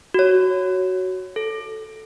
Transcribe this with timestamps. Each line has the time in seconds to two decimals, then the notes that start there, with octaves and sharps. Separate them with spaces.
0.14 F#4 C#5
1.36 A4